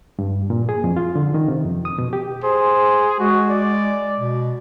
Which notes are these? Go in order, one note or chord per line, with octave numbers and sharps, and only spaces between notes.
G2
A#2
G#4
F2
F4
D3
D#3
C3
F2
D#6
B2
G4
G#4 C5
G#3 F#4
D5
B2